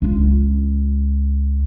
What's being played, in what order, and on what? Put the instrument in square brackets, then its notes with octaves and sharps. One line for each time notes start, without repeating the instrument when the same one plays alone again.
[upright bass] C#2 F4